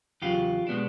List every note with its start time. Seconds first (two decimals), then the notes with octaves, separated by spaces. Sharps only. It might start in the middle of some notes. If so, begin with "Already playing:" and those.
0.22 E2 C#3 F#3 F4 G4
0.67 B2 G#3 B3 D4